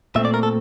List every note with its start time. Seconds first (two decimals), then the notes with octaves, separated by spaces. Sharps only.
0.16 A#2 A3 C4 E5
0.25 D5
0.34 A#4
0.43 A4